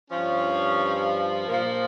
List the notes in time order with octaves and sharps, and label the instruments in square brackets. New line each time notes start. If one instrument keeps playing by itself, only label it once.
[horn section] G2 F3 C#4
A#2 F3 A#3